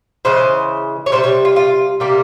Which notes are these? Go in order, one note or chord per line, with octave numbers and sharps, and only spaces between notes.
C#3 E3 G#3 C5
C#5
C3 E3 G3 C5
C#5
F4
F4
C3 G3 A#3 G4